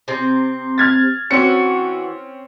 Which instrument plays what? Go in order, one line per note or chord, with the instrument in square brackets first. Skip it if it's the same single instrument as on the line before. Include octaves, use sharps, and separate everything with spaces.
[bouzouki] C3 C4
[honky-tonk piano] F6 G#6 A6
[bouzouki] E3 F#4 [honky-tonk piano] C4 C#4 C#7